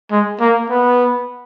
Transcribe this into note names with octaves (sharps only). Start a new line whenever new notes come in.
G#3
A#3
B3